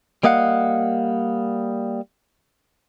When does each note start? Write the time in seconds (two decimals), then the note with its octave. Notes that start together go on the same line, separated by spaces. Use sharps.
0.23 G3 A#3 D#5 F5 F#5